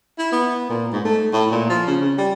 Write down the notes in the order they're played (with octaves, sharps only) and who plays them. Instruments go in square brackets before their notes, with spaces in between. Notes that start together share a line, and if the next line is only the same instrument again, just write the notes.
[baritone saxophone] E4
B3
A#2
G#2
A3
A2
A#2
F3
C#3
C#3
G3